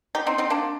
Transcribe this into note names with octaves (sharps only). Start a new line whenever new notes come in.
D#4 G4
C4 D#4
C4 D#4
A#3 D4